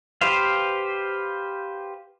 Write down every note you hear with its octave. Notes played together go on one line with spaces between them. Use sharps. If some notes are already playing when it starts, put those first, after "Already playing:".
G4 B4 C5 F5